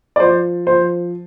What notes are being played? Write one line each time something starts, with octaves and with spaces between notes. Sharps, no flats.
D5
F3 C5
F3 C5